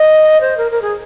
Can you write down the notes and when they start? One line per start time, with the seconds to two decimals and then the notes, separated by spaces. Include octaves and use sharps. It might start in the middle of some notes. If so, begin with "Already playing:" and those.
Already playing: D#5
0.41 C5
0.57 A#4
0.72 A#4
0.82 G#4